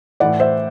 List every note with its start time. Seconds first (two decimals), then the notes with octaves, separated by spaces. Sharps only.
0.20 A2 E3 D5 F#5
0.40 C5 E5